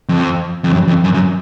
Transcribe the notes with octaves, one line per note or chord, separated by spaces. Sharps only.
F2
F2
F#2
F2
F#2
F#2